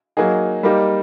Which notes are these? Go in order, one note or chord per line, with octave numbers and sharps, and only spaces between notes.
F#3 A#3 D#4 G#4
G3 A#3 D#4 G4